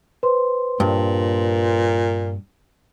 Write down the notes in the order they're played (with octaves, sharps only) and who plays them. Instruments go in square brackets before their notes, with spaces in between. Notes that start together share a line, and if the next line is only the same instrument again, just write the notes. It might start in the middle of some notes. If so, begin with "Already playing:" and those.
[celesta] B4 C5 C6
[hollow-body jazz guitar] G2 [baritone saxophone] A#2